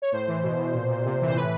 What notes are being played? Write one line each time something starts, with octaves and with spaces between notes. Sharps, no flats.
C#5
A2 C5
E3
B2
B2
A#2
A#2
C3
E3
C5
A2 B4